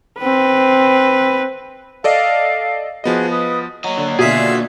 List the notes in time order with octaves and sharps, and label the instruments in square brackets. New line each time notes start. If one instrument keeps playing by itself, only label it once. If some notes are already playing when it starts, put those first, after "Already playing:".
[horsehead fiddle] C4 B4
[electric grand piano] A4 D5 D#5 [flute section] F5
[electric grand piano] F3 B3 D#5 [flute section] F#4 G#4
[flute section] B4 D#6
[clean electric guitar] F#3 [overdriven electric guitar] A#3 D#5
[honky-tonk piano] D3
[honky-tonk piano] B2 D3 [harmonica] F4 E5 [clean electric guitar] G#4